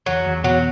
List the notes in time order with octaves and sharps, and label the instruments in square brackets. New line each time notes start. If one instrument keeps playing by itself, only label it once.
[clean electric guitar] E2 [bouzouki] F#3
[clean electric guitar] E2
[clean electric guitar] B2 [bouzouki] F#3